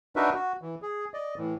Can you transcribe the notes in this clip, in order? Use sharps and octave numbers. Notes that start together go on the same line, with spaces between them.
D4 D#4 F#4 A#4 B4 E5
F#4
E3
G#4
D5 D#5
A2 E3